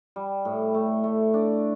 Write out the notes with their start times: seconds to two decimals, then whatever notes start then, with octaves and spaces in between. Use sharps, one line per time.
0.16 G3
0.45 A2
0.74 A3
1.04 A3
1.34 D4